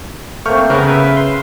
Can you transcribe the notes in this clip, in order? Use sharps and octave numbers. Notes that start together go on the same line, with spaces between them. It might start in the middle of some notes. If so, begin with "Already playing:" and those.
A3 A#3 C4 C#6 F6 G6
C#3 B3 A#4 B4
B4 E5
C6